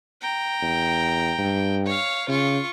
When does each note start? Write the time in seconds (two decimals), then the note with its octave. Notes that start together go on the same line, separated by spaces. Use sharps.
0.21 G5 A#5
0.62 E2
1.38 G2
1.86 C#5 F5
2.29 C#3 F4 C#6